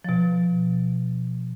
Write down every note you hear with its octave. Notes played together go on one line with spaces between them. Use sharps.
B2 F3